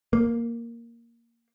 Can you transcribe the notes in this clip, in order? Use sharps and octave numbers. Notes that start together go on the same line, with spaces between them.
A#3